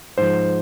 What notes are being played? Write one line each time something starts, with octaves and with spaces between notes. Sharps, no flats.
G#2 F3 C5